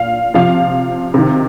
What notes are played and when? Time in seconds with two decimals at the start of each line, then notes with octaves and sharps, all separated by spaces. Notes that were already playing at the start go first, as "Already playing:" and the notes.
Already playing: A#2 F5
0.34 C3 F3 F5
1.14 C3 D#3